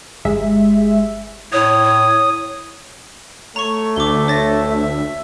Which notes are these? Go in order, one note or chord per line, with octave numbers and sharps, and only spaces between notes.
G1 G#3 E5
A2 C#5 D#6
C#5
A3 C#5 A#5 C#6
D2 E5 D6 G7
C#5 A6 A#6
E5